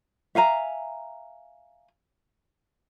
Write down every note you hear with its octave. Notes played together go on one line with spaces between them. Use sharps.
E5 F5 G#5 A#5